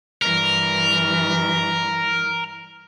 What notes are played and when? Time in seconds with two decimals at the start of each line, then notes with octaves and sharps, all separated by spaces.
0.22 G2 E3 A#4